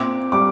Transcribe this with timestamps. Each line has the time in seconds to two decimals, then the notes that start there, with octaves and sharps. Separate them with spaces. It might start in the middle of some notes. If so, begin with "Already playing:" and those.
Already playing: A#2 C4 D6
0.32 G3 D6